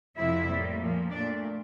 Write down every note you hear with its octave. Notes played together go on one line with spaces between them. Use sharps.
F2 C3 F3 A3 E4 E5
A2 G3 A#3
A#2 F3 A#3
A#2 A3 D4 D5